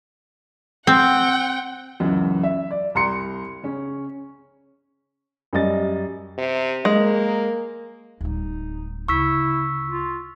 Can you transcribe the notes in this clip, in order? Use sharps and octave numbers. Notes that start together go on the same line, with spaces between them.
C4 F#5 G5
C#2 F#2 E3
E5
D5
C2 A#5 C6 C#7
C#3 C#4
F#2 G3 D#5 A6
C3
G#3 A#3
D1 G3 D#4
D2 C#3 E4 C#6 E6 B6
F4